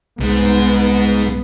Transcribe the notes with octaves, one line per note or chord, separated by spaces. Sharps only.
C2 G#2 B3